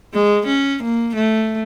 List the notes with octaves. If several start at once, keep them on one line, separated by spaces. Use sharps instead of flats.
G#3
C#4
A#3
A3